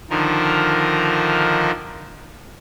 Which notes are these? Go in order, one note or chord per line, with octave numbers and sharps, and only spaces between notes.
D3 D#3 F3 D#4 A#4